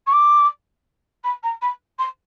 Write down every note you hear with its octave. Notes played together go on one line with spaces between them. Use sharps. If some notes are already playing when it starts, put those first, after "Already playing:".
C#6
D6
B5
A#5
B5
C6